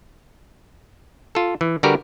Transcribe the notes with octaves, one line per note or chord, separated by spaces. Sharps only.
F4 A4
E3
D3 G3 F#4 G4 A#4 B4